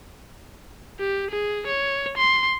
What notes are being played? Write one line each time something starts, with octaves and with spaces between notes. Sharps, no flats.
G4
G#4
C#5
C6